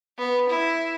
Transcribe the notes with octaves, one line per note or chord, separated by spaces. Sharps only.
B3
E4